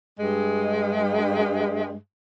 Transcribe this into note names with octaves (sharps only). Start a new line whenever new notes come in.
G2 G#3